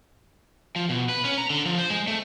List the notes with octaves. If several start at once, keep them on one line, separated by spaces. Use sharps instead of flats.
F3
B2
B4
C#4
A#5
D3
F3
C5
G#3
A3